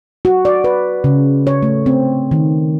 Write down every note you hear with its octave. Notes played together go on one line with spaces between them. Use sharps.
F#4
D5
B4
C#3
C#5
A3
C4
D#3